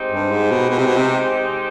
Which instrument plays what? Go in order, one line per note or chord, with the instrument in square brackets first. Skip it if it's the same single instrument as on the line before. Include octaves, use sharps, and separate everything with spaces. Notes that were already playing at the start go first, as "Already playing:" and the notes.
Already playing: [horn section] G#3 C4 D#4 G4 C5
[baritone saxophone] G2
G#2
B2
B2
C3
B2
C3